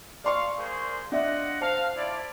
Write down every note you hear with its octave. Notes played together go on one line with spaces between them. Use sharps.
D5 F5 C6 C#6
A#3 G#4 C5
D4 F4 D#5 E5 F#5
C5 F5 A5
E4 F4 D5